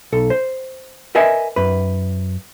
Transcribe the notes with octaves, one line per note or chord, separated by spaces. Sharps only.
B1 A4
C5
A#4 B4 D#5 E5 G#5
F#2 B4